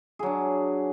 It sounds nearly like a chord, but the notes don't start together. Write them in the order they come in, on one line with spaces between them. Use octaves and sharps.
G#4 F#3 D4